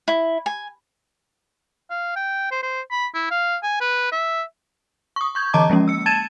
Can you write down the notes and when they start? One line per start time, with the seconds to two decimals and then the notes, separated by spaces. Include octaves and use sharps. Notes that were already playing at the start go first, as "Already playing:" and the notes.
0.08 E4
0.46 G#5
1.90 F5
2.16 G5
2.51 C5
2.63 C5
2.91 B5
3.14 E4
3.31 F5
3.63 G#5
3.81 B4
4.12 E5
5.16 C#6 D#6
5.35 C#6 G6 G#6
5.53 D3 E3 D#5 A5 A#5 D6
5.70 F3 G#3 A#3 C#4
5.88 E6 C#7
6.06 A5 G#6 A6 D#7 E7